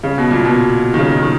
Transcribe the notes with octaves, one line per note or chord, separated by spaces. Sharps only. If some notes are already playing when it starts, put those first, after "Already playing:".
C#3
B2
A#2
B2
D#3
C#3
D#3